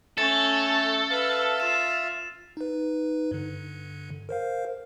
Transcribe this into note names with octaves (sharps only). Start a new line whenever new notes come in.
A3 C#4 A4 A6
B4 E5 F5 E6
F4 E7
D#4 B4
G2 D3
A#4 C5 F5